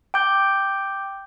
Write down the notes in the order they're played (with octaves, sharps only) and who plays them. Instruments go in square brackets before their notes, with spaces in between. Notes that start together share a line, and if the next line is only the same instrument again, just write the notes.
[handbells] G5 D6 G6